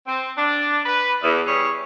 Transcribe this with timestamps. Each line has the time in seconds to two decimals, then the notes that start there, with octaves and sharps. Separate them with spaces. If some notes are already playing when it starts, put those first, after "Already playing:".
0.07 C4
0.37 D4
0.86 B4
1.21 E2
1.46 E2 G3 G#4 C#5